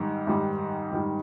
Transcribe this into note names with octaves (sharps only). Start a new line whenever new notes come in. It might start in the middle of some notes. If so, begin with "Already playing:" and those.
Already playing: G#2 D#3 G3
G#2 D#3 G3
G#2 D#3 G3